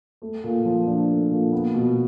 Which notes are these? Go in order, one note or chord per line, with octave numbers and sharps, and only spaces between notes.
A3
A#2
F3
D4
A3
A#2
B3
B2